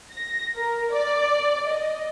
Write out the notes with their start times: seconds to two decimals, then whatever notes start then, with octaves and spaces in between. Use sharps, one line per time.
0.12 A#6
0.56 A#4
0.92 D5
1.67 D#5